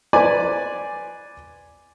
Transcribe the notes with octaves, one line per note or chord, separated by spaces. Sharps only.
B4 C5 D5 G#5 C6